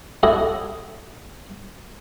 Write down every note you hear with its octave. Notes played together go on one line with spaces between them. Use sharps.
C#4 E4 F#4 G4 A4 D#5